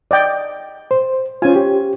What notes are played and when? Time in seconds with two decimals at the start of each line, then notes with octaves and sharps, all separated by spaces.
0.11 D5 D#5 G5
0.91 C5
1.42 C#4 F4 C5 G#5
1.56 G4